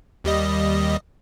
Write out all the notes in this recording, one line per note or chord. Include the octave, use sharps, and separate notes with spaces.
D#2 G3 D#5